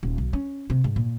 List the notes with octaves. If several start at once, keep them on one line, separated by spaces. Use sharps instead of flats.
D#1
B1
C#4
C3
G#2
A#2